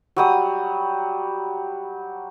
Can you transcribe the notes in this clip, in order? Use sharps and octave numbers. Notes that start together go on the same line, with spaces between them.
F#3 G3 D#6